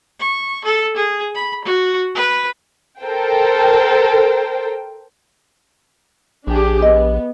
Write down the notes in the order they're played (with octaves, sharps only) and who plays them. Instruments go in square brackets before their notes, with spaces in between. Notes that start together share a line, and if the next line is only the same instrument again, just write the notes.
[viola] C#6
A4
G#4
B5
F#4
B4
[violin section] A4 A#4 C5 G5
[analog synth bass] A#1 [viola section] D4 G4 G#4
[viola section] B3 [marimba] D#5